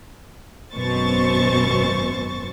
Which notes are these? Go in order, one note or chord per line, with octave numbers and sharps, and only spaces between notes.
G#1 F#2 B2 C5 C#6 A6